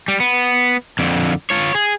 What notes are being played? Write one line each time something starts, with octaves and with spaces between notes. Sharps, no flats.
G3
B3
F2 D3
F4 C#5
G#4